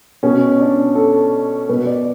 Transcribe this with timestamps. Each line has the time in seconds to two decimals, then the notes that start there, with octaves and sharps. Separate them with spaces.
0.23 B2 C#4
0.60 D4
0.95 A4
1.69 B2 B4
1.86 D5